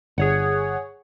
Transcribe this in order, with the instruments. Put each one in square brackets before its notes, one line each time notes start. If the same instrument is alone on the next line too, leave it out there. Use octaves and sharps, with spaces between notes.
[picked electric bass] G1 [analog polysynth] G#4 C#5 F#5